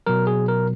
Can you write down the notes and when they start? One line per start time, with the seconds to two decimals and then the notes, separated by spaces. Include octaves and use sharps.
0.07 B2 F#3 A#4
0.27 G#4
0.48 A#4